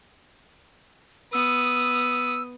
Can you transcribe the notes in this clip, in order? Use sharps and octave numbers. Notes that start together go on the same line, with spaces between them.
B3 D#6 E6